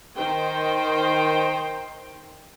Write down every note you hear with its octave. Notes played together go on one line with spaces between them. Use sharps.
D#3 D#4 C5 G5